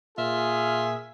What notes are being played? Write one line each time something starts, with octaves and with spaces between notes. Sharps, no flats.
A#2 F4 G#4 E5